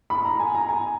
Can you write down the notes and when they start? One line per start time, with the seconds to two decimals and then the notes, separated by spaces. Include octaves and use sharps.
0.10 B5
0.25 A#5
0.40 G#5
0.55 A#5
0.69 G#5